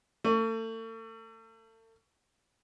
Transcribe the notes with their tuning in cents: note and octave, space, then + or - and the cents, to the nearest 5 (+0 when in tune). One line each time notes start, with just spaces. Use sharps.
A3 +40